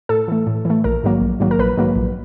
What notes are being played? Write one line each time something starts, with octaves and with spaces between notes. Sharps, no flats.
A2 A4
E3 A3
A2
E3 A3
A#1 A#4
G#2 D#3 F#3 A#3
A#1
G#2 D#3 F#3 A#3
A#4
A#1 B4
G#2 D#3 F#3 A#3
A#1